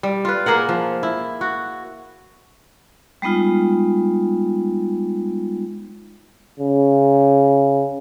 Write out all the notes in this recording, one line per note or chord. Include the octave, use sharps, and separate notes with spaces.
G3
F4 B4
A#3 G#4 A#4 F#5
F3
E4
F#4
G3 G#3 B3 D#4 F4
C#3